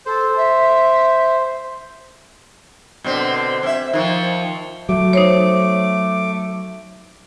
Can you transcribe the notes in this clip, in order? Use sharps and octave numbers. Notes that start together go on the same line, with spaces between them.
A4 C5
E5
B2 D3 C4
C4 E5
D#3 F3
F#3 A3 D6
D#4 C5 C#5